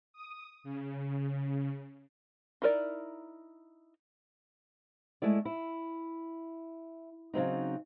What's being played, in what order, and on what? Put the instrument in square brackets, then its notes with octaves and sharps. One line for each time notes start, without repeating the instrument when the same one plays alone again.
[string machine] D#6
C#3
[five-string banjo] D#4 E4 A#4 B4 D5
[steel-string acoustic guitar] G#3 A3 E4 D5
E4
C#3 F#3 C4 D#4